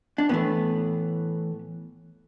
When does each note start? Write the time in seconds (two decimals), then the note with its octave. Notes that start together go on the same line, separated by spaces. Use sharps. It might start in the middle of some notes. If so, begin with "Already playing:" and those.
0.18 D4
0.29 A2 E3 A3 B3